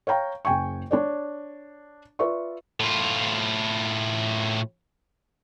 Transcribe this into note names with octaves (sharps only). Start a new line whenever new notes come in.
C#5 F5 G5 A#5
F#1 C#3 G5 G#5 C#6
D4 C#5 D5
F4 B4 D5 E5 C#6
A2 F4